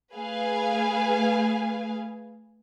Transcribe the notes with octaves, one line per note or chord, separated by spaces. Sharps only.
A3 G#4 B4 F5 G#5